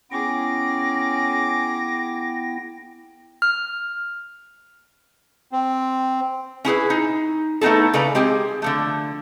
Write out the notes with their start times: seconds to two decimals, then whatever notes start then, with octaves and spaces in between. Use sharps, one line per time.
0.11 B3 C#4 E4 G#4 G5 D6 A#6
3.42 F6
5.52 C4
6.65 C#4 E4 G#4 B4
6.90 D#4
7.61 A3 B3 D#4 E4 A4
7.94 C#3 A4 B4 D5 A#5
8.15 G#3 C4 G4 G#4
8.62 D3 F3 A3